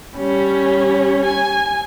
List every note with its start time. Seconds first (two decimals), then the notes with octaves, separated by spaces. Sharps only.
0.16 G3 C#4
1.26 G#5